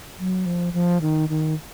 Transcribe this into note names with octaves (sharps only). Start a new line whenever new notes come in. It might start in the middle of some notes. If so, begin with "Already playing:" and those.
F#3
F3
F3
D#3
D#3